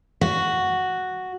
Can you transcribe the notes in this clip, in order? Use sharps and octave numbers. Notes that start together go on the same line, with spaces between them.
F#4